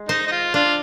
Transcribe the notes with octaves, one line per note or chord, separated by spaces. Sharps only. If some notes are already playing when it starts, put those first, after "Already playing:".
Already playing: G#3
D#4 C5
D#4
F4
D4 F4